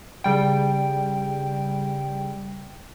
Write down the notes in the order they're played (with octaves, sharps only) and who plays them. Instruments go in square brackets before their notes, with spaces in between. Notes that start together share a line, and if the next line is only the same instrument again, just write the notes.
[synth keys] C#3 G3 G5